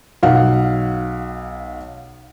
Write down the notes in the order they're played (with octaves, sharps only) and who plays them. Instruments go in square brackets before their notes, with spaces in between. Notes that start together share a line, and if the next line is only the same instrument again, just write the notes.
[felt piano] B1 F5 F#5